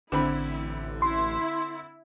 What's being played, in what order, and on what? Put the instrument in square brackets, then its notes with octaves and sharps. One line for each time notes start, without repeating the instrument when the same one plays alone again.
[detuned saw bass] A1 [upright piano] D3 C4 B5 [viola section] E4
[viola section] E4 [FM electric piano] C6